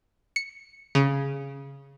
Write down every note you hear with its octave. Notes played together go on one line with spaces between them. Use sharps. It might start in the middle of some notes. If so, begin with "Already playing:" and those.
C#7
C#3